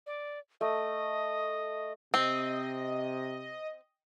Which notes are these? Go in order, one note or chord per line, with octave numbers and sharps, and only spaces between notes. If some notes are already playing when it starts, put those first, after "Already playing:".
D5
A3 D#5
C3 C4 D#5